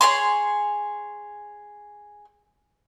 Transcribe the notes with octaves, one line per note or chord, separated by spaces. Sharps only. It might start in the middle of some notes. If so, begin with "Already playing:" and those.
G#4 C#5 C6